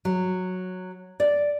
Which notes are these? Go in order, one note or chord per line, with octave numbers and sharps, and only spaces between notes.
F#3
D5